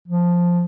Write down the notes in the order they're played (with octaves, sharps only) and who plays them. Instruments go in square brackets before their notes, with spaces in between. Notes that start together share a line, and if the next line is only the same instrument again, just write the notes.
[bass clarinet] F3